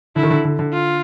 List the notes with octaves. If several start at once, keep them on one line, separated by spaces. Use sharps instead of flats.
D3 E4
D#3
D3
D3
D3
F4